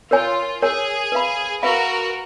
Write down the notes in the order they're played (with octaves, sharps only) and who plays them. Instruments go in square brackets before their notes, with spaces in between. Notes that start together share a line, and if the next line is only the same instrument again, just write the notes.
[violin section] F4 [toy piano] A#4 C#5 G#5
[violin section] G#4 [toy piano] A#4 C#5 G#5
[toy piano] B4 F5 B5
[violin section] F#4 A#4 [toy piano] B4 F5 B5